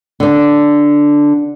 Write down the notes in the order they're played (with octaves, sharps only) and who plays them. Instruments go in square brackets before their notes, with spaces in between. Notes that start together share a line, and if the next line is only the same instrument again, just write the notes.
[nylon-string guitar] D3 D4